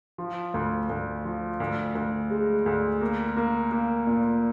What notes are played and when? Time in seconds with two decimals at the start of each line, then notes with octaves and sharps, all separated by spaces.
0.18 F3
0.54 D2
0.90 D2
1.25 F3
1.60 D2
1.95 D2
2.30 G#3
2.66 D2
3.01 A#3
3.36 A#3
3.71 A#3
4.07 A#2